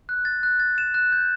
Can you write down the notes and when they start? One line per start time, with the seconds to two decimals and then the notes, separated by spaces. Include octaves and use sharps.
0.09 F#6
0.25 A6
0.43 F#6
0.59 A6
0.78 E7
0.94 F#6
1.12 G6